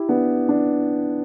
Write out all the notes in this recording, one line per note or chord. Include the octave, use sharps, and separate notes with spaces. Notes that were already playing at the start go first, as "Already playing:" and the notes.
Already playing: E4 G4
B3 D4
D4